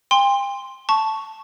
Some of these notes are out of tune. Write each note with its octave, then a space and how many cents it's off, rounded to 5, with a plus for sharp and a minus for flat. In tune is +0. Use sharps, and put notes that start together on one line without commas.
G5 +40 C6 +0
A5 +0 C#6 +0